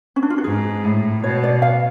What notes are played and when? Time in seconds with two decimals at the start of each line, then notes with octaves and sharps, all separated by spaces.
0.16 C#4
0.23 D4
0.30 F4
0.38 F#4
0.44 G#2 G#4
0.84 A2
1.24 B2 C#5
1.44 D5
1.62 F5